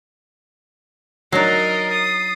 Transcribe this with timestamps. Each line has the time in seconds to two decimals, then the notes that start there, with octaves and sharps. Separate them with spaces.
1.32 F#3 D4 D#4 A#4 D#5 A6 C7
1.91 D#6 A6 C7